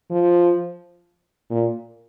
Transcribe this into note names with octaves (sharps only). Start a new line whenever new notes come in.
F3
A#2